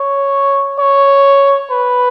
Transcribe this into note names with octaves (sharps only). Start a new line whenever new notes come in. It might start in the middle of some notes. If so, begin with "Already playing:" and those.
Already playing: C#5
C#5
B4